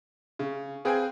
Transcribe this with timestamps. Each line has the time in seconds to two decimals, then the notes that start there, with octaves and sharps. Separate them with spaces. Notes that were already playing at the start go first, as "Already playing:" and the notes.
0.39 C#3
0.85 C4 G#4 B4 F5 G5 G#5